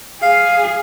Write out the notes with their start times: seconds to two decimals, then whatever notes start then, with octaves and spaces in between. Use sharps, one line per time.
0.22 G#4 F5